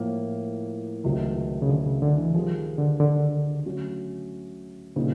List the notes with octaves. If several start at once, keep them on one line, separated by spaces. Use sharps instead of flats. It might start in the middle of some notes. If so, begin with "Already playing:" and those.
Already playing: A2 F3 A#3
C#2 C3 D#3 F#3 A3
C#3
D3
C#3
D3
E3
D#3 F3 G3 C4 F4 G#4
D3
D3
D3 F#3 A3 C#4 F#4
A#2 C#3 G3 C4 D#4